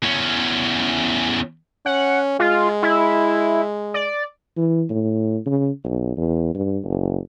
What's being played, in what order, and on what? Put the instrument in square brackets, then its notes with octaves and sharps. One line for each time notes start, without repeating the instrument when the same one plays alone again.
[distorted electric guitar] E2 C#4
[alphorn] C#4 [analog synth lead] F#5
[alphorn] G#3 [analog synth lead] F4
[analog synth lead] E4
D5
[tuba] E3
A2
C#3
B1
E2
G2
F#1